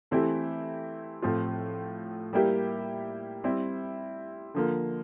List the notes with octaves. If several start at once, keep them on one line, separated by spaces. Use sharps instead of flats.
E3 A3 C4 E4 G4
A2 F3 C4 F4
G3 A#3 E4 G4
G3 C4 E4
D3 F3 A#3